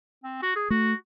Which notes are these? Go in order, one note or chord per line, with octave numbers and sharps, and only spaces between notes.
C4
F#4
G#4
A3 F#4